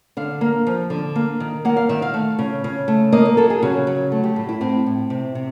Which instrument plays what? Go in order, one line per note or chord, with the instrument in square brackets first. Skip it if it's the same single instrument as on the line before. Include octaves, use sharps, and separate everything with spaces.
[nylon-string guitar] D3 F5
A#3
F3
D3
A#3
D#3
A#3 F#5
F5
D#3 E5
F5
A3
C#3
C#3
A3
A#3 D#5
A#4
F#3 A4
G#4
C#3 F#4
F#3
A3
G4
A2
E4
A2 C4
A2
C3
C3